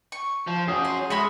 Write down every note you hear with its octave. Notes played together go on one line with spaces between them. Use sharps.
C#6
F3
C#4 D4 F#4 G#4
G#4 C6
G#3 F#4 G#4 A4 E5 B5 C6